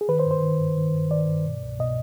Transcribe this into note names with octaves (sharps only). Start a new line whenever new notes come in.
G#4
D#3 B4
C5
G2
C5
D#3
G2
D#3
G2
D#3 D5
G2
B2
C2
B2 D#5